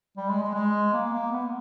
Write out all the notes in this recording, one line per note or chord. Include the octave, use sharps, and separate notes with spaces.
G3
G#3
G#3
G#3
A#3
A#3
B3